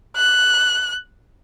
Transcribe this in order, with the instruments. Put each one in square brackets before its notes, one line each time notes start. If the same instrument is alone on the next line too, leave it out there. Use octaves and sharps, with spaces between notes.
[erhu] F#6